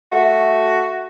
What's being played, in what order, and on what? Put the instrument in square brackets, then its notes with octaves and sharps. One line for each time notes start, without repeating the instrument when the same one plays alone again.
[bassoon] A3 [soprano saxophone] F#4